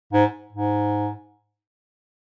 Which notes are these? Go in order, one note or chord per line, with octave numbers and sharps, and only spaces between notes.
G#2
G#2